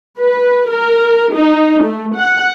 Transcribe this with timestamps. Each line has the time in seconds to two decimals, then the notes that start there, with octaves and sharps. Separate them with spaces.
0.20 B4
0.70 A#4
1.33 D#4
1.84 A3
2.17 F#5